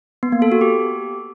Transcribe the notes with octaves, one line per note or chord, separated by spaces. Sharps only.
B3
A#3
A4
F#4
G4